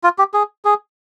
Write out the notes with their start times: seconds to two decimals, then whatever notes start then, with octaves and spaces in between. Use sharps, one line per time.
0.04 F4
0.19 G4
0.34 G#4
0.65 G#4